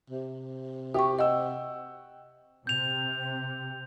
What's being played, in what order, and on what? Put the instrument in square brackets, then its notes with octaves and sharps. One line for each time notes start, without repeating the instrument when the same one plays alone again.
[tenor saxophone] C3
[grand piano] G4 [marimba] E5 G5 C#6
[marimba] D#5 [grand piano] F#5 G5 E6
[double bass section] C3 [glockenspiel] G6 F7